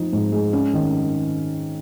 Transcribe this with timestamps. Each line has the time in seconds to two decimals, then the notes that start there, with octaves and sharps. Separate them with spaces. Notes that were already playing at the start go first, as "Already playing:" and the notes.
Already playing: F3 D#4
0.13 G#2
0.32 G#3
0.53 C#4
0.73 D#3